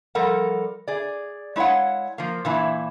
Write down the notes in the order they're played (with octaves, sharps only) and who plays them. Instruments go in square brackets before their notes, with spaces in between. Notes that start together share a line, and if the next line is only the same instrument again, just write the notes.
[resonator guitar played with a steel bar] F3 G3 A4 A#4 F#5
G#4 D5
G#3 E4 C#5 F5 F#5
F3 A#3
A#2 E3 E4 A5